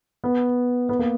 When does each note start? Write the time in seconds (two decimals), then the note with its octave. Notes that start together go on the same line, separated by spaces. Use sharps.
0.24 B3
0.89 B3
0.99 A#3